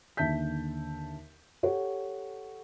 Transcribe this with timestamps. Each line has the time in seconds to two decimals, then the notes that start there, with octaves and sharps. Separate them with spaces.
0.17 D#2 D3 E5 A5 G6 B6
1.63 G4 A4 C#5 F#5